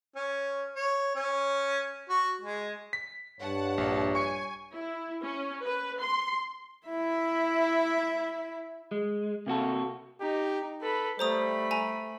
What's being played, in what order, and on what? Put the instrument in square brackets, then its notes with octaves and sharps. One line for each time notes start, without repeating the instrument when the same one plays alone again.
[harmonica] C#4
C#5
C#4
F#4
G#3
[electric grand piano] B6
[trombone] G2 [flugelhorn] C#5 [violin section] F#5 A5
[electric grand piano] A#1
[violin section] G#5 [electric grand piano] C#6 C#7
[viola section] E4
C#4
B4
C6
[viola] E4 E5
[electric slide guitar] G#3
C3 A#3 F#4 A4
[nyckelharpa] D#4 [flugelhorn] G4
[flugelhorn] A4 [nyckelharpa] B4 B5
[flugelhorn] G3 [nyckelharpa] A3 B5 [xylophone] C5 A#5 D#6
[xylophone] G#5 A#5